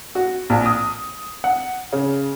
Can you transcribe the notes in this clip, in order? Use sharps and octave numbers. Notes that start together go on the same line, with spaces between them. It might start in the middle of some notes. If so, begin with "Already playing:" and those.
F#4
A#1
D#6
F#5
C#3